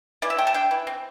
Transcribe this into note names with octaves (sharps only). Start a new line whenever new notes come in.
E3 D5
E5
A3 G5
A5
D4 G5
E3
C4